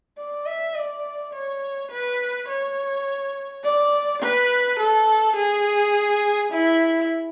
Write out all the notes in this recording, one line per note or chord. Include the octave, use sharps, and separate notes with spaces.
D5
E5
D5
C#5
B4
C#5
D5
B4
A4
G#4
E4